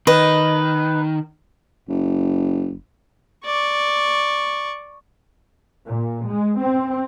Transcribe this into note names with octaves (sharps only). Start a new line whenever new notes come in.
D#3 B4 D#5
F#1
D5 C#6
A#2
G#3
C4